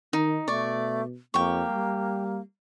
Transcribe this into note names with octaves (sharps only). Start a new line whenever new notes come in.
D#3 D#4
B2 A3 D5 C#6
F2 A#3 G4 C#6
G3